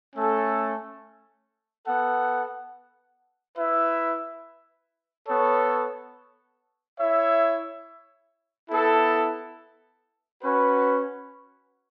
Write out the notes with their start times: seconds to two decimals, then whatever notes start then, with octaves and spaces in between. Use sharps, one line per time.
0.14 A3 C#4 A4
1.86 B3 A4 F#5
3.57 E4 B4 E5
5.28 B3 A4 C#5
6.99 E4 C#5 E5
8.70 B3 E4 A4
10.41 C#4 F#4 B4